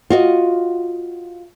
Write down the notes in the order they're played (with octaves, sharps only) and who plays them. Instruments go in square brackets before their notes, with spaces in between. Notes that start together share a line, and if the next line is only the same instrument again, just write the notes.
[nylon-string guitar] F4 F#4 D#5